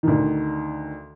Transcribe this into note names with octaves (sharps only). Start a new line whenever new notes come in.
D2 D#3